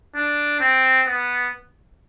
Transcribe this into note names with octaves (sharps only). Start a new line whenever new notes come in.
D4
C4
B3